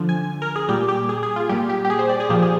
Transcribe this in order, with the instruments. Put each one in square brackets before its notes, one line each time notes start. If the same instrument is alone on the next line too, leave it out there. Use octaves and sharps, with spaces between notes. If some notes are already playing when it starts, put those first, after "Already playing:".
Already playing: [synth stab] D3 F3
G#5
A#4
G#4
A#2 G3 G4
G4
G#4
G#4
F4
A#2 G3 G4
G4
G4
G#4
C5
D5
G#4
A#2 F3 G4
G#4